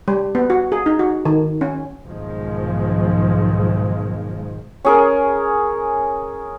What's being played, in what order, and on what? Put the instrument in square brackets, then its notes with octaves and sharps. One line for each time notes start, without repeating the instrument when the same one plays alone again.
[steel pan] G3
B3
F#4
G#4
D#4
F#4
D#3
C#4
[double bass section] B1 G#2 D#3 F3 G#3
[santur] C#4 G#4 A#4